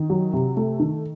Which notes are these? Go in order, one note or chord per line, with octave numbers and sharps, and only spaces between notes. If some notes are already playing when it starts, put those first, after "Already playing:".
Already playing: D#3
F#3
C3
A3
D#3